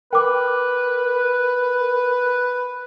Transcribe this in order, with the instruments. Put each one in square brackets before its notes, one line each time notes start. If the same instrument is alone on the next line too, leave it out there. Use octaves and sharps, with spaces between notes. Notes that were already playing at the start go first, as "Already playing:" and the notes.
[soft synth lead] A#4 [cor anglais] B4 [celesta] G5 D6